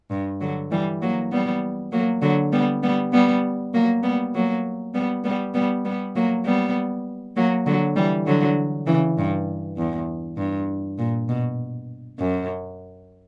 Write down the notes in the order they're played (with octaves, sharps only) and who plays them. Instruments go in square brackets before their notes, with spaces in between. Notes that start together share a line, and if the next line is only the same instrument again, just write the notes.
[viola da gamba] G2
D3 F#3
E3 G3
F#3 A#3
G3 B3
F#3 A#3
D3 F#3
G3 B3
G3 B3
G3 B3
F#3 A#3
G3 B3
F#3 A#3
G3 B3
G3 B3
G3 B3
G3 B3
F#3 A#3
G3 B3
F#3 A#3
D3 F#3
E3 G3
D3 F#3
C#3 E3
G2
E2
G2
A#2
B2
F#2